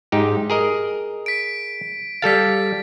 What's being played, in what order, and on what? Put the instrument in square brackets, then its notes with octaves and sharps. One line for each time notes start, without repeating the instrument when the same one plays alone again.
[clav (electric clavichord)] G#2 D#4 G4
G#4 A#4 D#5
[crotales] B6 D7
[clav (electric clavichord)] G3 A4 F5 [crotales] A6 B6